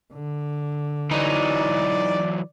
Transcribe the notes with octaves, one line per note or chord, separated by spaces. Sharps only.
D3
E3 F#3 D#4 D5